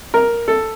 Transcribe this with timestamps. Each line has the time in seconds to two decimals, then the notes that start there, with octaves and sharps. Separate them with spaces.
0.14 A#4
0.48 A4